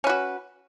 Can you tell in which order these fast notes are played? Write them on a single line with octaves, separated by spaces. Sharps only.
C#4 B4 F#4